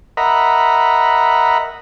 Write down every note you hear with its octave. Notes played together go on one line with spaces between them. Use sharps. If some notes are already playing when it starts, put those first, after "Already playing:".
A#4 D#5 E5 F#5 A#5 B5